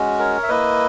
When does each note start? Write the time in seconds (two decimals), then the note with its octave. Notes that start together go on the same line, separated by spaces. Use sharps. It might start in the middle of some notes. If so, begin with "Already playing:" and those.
Already playing: G#3 C#4 F#4
0.19 A#4 C#5
0.43 E5
0.49 A#3 E4 B4 D#5